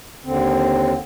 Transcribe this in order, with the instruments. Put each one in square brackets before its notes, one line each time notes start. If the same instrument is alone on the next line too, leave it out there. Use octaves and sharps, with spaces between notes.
[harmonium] D#2 D3 C4